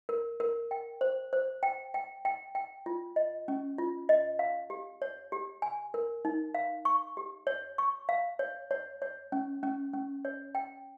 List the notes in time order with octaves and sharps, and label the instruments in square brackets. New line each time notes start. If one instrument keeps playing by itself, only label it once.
[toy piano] A#4
A#4
G5
C5
C5
G5
G5
G5
G5
F4
D#5
C#4
F4
D#5
F5
G4
C#5
G4
G#5
A#4
D#4
F5
C#6
G4
C#5
C#6
F5
C#5
C#5
C#5
C#4
C#4
C#4
C#5
G5